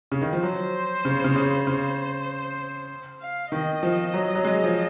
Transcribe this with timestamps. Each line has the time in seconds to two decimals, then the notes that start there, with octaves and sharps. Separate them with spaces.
0.12 C#3
0.21 D#3
0.33 F3
0.43 F#3 C5
1.05 C#3
1.24 C#3
1.36 C#3
1.66 C#3 C5
3.21 F5
3.52 D#3 D#5
3.83 F3
4.14 F#3
4.35 F#3
4.44 G#3
4.64 F3